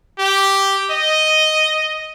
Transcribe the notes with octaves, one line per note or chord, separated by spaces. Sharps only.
G4
D#5